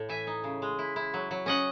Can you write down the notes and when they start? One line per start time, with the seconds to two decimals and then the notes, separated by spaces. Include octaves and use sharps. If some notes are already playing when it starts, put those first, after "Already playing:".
Already playing: A2
0.09 E3 E5 G#5
0.27 D#4
0.44 C#3
0.62 G#3
0.79 E4
0.96 E4
1.14 F#3
1.31 F#3
1.46 C#4 D#5 F#5